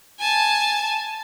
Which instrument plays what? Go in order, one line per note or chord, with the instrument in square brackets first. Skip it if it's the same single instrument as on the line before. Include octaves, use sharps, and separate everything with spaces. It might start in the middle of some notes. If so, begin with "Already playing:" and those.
[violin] G#5 A5